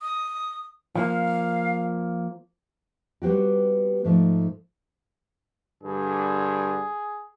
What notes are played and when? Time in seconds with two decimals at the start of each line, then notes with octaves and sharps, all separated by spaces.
0.01 D#6
0.95 F3 A#3 F5
3.22 G3 B3 C4 F#4 G4
4.05 G#2 F3 A3
5.84 G2 D3 G#4